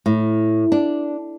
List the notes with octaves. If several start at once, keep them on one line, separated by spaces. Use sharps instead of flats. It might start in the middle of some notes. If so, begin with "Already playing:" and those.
A2
D4